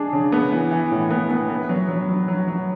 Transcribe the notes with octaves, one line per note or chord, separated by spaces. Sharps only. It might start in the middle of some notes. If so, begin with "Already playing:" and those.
Already playing: G#3 D4 G#4
C#3
B3
E3
E3
A2
B3
B3
B3
F#3
F#3
F#3
F#3
F#3